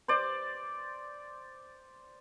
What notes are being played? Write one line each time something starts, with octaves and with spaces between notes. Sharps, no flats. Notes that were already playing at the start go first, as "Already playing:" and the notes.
C5 D5